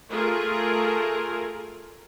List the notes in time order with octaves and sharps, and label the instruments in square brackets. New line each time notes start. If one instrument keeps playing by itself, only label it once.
[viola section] A3 F4 G#4 A#4